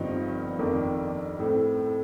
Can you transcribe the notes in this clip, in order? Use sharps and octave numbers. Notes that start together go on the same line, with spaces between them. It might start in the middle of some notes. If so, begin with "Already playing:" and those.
Already playing: G1 G2 F3 C4 D#4
F2 D#3 A#3 D4
A2 A3 C4